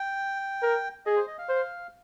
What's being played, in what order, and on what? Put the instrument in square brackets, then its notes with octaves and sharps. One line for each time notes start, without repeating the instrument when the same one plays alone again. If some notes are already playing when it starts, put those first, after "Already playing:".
Already playing: [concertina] G5
[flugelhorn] A#4
[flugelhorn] G#4 [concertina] D#5
[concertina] C5
D#5
F5
[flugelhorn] C5